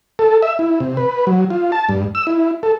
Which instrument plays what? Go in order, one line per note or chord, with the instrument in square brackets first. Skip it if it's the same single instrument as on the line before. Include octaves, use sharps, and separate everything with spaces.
[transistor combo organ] A4
E5
E4
C3
B4
F#3
F4
A5
G2
E6
E4
A4